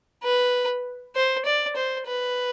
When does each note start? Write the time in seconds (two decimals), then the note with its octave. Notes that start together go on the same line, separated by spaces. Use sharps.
0.24 B4
1.16 C5
1.45 D5
1.76 C5
2.07 B4